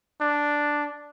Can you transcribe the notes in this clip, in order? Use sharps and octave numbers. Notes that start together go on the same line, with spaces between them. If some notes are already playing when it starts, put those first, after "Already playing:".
D4